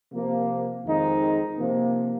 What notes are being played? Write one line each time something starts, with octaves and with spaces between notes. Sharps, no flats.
C3 F3 A#3
F2 D#3 G#3 C4 D#4
C3 F3 A#3